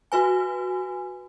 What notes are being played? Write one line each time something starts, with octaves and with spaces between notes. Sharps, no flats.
F#4 B4 G#5